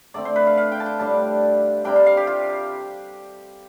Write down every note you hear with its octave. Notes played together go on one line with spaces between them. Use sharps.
D3 A3 C4 D5
C5
B4
F5
F5
G5
A5
G5
A2 G3 D4 A5
C3 G3 D4 G5
F5
F5
G4
F4